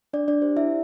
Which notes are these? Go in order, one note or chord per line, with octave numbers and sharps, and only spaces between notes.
D4 D5
D4 D5
G4 C5
E4 E5